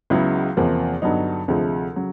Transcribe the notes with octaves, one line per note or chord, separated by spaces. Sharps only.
C#2 C#3 F#3 B3 E4
E2 C3 F3 A#3
G2 D3 F#3 B3 D#4
D2 C3 F3 G#3
C#3 F#3